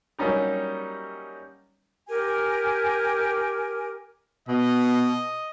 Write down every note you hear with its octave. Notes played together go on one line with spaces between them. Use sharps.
F#3 G3 A#3 C#4 D#4 G4
G4 A#4 G#5
B2 D#5